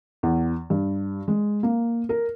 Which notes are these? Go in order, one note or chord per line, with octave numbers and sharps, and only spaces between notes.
E2
G2
G#3
A#3
A#4